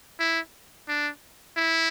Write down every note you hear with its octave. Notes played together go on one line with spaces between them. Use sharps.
E4
D4
E4